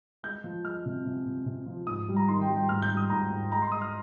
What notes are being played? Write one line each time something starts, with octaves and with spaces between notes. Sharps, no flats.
G#3 G6
F3
G#3 F6
C3
C3
C3
C3
F3
G#2 D#6
G3
A#5
D#3 C6
G5
G3
G5
G#2 F6
G6
G3
D#6
G#2 A#5
G#2
G#3 A#5
C6
G#3 D#6
F6